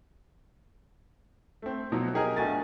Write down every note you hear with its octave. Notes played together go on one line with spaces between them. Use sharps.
A3 C4
B2 F3 F#3 B3
G4 G#4 A#4 D#5 G#5
A#1 A3 F#4 G#5 A6